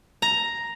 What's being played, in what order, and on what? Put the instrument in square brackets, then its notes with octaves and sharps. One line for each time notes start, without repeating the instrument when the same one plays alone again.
[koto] A#5